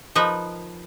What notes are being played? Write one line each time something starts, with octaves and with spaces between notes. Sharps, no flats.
F3 D#4 A#4 B4